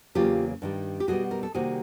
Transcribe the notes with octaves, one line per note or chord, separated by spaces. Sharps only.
E2 C#3 F#3 A#3 F4 G4
G2 D#3 G3
G4
B2 G3 B3 F#4 G#4
A#4
A4
C3 D#3 G3 A#3 F#4 G#4